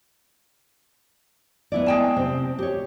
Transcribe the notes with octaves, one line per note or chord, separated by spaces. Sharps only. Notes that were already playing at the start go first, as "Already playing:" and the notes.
B3 E4 D5
G#3 G5 A5
C3 C4
G4 C#5